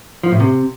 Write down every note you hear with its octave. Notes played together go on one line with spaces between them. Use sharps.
F3
A2
C3